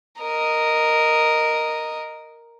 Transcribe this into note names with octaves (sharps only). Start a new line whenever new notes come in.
A#4 D#5